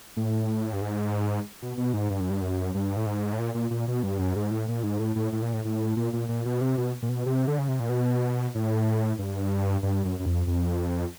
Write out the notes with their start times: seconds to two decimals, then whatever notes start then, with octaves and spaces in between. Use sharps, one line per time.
0.17 A2
0.73 G2
0.82 G#2
1.62 B2
1.77 B2
1.94 G#2
2.10 G2
2.20 F#2
2.30 G2
2.42 F#2
2.75 G2
2.96 A2
3.06 G#2
3.33 A2
3.38 A#2
3.54 A#2
3.71 A#2
3.88 B2
4.03 G2
4.19 F#2
4.36 G#2
4.51 A2
4.68 A#2
4.83 G#2
4.99 A2
5.16 A2
5.33 A2
5.42 A#2
5.54 A2
5.65 A2
5.97 A#2
6.13 A#2
6.29 A#2
6.45 B2
6.61 C3
6.78 B2
7.02 A#2
7.09 B2
7.26 C3
7.48 D3
7.59 C#3
7.69 C3
7.80 A#2
7.89 B2
8.55 A2
9.19 G2
9.83 G2
10.05 F#2
10.20 F#2
10.26 F2
10.47 F2